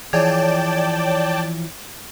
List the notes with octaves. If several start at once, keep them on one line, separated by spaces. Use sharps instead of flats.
E3 F3 G#4 C#5 D5 G5 A5